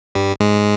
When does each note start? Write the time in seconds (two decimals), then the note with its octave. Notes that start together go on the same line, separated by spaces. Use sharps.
0.15 G2 G3
0.40 G#2 G#3